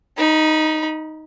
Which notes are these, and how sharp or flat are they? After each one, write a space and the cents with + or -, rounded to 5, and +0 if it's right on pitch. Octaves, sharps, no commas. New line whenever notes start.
D#4 +0 B5 -35